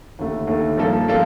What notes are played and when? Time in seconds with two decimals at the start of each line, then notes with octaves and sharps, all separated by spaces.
0.19 D#2 D3 A3
0.47 D#2 D3 A3
0.77 G2 F3 A#3 F4 A4
1.08 F3 A#3 F4 A4